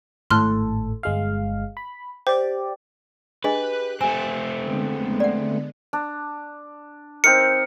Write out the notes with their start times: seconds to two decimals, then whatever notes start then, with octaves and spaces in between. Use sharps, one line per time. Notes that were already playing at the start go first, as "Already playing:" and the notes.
0.30 G#1 A2 A4 C6 F6 F#6
1.03 G1 G#3 F5
1.77 B5
2.27 G4 C5 D5
3.44 D4 G4 G#4 B4 D#5 F#6
4.01 A3 C4 G#5
4.58 D3 G#3 B3
5.20 D5 F#5
5.93 D4
7.24 C4 D#4 A#4 C#7